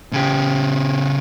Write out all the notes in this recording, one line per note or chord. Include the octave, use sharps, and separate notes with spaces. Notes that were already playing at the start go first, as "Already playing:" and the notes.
C#3 G4